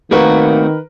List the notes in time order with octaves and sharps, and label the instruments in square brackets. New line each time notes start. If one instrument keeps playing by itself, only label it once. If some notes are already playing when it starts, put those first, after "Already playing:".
[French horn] D#3 [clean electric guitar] A3 C4 F#4 [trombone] A#3 [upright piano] A#4 B4